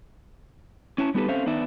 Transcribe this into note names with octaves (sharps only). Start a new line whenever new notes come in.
C#4 E4 C#5 A5
G3 B3 D#4 G4 A4 B4
C4 C#4 A4 C5 E5 F5
D#3 B3 D4 D#4 D5 E5